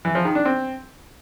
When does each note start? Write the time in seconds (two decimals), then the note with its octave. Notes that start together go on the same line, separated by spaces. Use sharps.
0.05 E3
0.15 F3
0.25 D#3
0.35 D4
0.45 C4